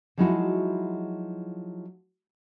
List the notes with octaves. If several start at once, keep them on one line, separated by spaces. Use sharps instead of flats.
F3 F#3 G#3 D#4 E4 F#4